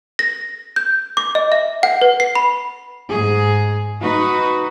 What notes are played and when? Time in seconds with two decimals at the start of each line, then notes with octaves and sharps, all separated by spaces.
0.19 A#6
0.76 G6
1.17 D6
1.35 D#5
1.52 E5
1.83 F#5
2.01 B4
2.20 C7
2.35 B5
3.10 G#2 G#4
4.02 D#4 F#4 B4